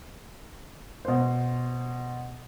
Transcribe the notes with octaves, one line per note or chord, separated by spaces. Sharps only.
B2 C5